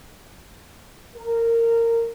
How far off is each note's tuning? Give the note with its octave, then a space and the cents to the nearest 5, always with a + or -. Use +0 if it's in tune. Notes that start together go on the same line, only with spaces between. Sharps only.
A#4 -15